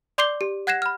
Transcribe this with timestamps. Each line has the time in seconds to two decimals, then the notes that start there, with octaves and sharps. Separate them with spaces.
0.18 D5 C6 D6 G6 C7 G7
0.41 G4
0.67 F#5 F#6 G#6 A#6 C7 E7
0.82 B5 F6